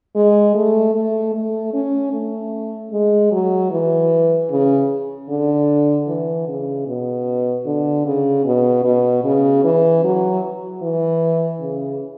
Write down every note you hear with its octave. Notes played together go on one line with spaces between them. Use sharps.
G#3
A3
A3
A3
C#4
A3
G#3
F#3
E3
C#3
D3
E3
C#3
B2
D3
C#3
B2
B2
C#3
E3
F#3
E3
C#3